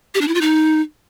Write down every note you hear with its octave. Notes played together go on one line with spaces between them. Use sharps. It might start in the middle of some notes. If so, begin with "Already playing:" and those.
G4
D4
E4
F4
D#4